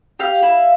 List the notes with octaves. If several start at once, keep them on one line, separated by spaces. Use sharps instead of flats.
G4 F5
E4